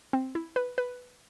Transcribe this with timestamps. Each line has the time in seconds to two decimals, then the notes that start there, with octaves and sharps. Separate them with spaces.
0.13 C4
0.35 E4
0.56 B4
0.78 B4